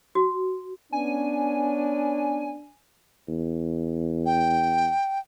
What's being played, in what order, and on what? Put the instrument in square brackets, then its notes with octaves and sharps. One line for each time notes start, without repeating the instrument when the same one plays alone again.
[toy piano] F#4
[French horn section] B3 C#4 [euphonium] D4 [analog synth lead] G#5
[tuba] E2
[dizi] G5